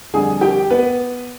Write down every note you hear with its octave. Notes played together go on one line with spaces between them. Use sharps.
F2 D3 G3 G#4 G#5
G4 G5
B3 B4